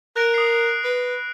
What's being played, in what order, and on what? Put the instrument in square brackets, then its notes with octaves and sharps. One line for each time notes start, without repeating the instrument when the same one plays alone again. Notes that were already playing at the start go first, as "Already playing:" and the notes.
[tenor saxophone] A#4 [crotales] F#6 A#6 D7
[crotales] D#6 C7
[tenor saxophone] B4